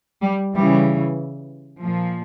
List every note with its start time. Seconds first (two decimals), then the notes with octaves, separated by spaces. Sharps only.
0.22 G3
0.54 C#3 E3 G3
1.80 A#2 F3